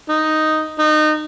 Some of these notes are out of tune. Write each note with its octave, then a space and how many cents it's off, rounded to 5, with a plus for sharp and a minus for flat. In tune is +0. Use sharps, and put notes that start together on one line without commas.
D#4 +0
D#4 -25